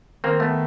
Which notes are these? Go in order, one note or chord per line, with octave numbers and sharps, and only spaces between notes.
D#3 A#3 C4
A3 B3